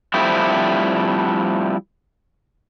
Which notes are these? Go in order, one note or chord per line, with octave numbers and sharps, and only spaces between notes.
F3 G3 A3 C4 D4 E4